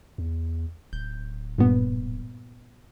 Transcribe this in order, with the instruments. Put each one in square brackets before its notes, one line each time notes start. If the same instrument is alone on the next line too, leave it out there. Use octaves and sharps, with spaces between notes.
[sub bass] E2
[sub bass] D1 [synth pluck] G6
[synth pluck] G2 A#2 B3